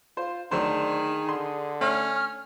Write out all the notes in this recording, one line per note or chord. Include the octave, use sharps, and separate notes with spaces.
F4 C5
D2 D#3 F#3 D4 G#4 C5
D3 C6
A3 C#4 F6